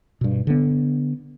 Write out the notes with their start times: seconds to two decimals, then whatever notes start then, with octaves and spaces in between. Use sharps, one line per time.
0.21 G2 B2
0.47 D3 B3